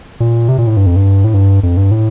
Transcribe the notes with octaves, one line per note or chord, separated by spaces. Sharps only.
A#2
C3
A#2
A2
G2
F2
G2
A2
G2
F2
G2
A2